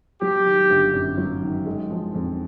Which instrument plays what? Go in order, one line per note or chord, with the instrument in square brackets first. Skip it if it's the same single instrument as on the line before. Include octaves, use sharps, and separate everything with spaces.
[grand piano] F#3 [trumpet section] G4
[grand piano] D#3
G1
F#2
F#3
D#3
G#3
F3
F2